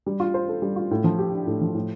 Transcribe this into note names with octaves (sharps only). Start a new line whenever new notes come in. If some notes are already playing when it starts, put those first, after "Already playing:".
G3
F4
C5
A4
G3
F4
A2
F3
G4
D4
A2
F3
A2